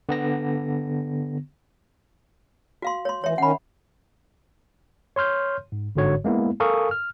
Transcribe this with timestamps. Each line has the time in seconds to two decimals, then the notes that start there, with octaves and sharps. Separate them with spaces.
0.09 D3 B3 A#6
2.82 F#4 F5 C6
3.05 C#5 C6
3.24 E3 C#5 E5
3.38 D#3 C#4 F#5 B5
5.16 C#5 C6 F6 G6
5.72 G#2
5.96 G1 G#2 D3 F#4 C#5
6.24 G#3 A#3 B3 E4
6.60 A4 A#4 F5 G#5 C#6 D#6
6.91 F6